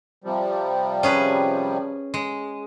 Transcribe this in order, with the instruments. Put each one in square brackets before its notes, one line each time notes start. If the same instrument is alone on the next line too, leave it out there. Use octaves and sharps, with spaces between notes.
[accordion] C3 F3 G3
[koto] C#4 G#4 B4
G#3